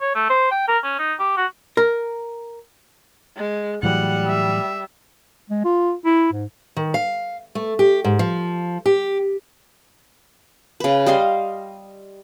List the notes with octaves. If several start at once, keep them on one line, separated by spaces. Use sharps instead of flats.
C#5
A3
C5
G5
A#4
C#4
D#4
G4
F#4
A#4
G#3
A2 E3 F#3 G3 F#5
E5
G#3
F4
E4
G#2
D#3
F5
A3
G4
G#2
F3
G4
C#3 B4
G3 D#5 F5 C6